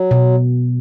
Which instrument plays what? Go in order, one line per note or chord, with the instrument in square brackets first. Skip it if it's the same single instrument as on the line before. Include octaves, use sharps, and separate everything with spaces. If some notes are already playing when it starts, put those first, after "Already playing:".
Already playing: [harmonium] F#3
[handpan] B2